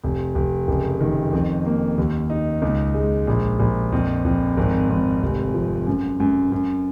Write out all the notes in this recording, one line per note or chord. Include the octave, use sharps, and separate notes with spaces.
F1
F1
F#1
D#3
F2
A#3
D#2
D#4
C#2
G#3
A#1
A#1
F2
F2
G#1
G#1
F1
F3
F#2
F#2
F#2